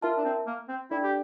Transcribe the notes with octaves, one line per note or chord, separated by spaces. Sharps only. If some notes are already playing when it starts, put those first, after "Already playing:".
E4 F4 A#4 E5 A5
D4
C4
A#3
C4
D4 E4 A4 D5 G5
G4